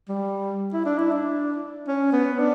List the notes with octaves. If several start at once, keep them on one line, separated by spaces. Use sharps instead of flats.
G3
E4
D4
E4
D4
C#4
B3
D4